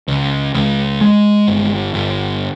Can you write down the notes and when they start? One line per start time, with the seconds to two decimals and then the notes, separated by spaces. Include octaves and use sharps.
0.08 C#2
0.55 C#2
1.01 G#3
1.48 G1
1.94 G1